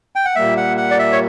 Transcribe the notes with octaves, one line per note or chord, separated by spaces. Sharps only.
G5
F#5
A#2 G3 A#3 E5
F#5
F#5
D5
E5
C#5